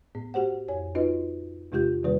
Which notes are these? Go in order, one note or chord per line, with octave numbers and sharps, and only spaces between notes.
A2 B3
F#4 G4 C5 F#5
F2 C#5 G#5
C#4 D#4 F4 F#4 B4 D#5
E2 C3 G#3 F4 G4 G6
E2 C3 D#3 G3 A#3 B4